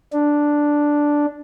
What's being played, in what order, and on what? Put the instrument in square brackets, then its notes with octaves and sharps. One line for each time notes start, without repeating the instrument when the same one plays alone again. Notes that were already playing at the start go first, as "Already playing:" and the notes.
[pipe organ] D4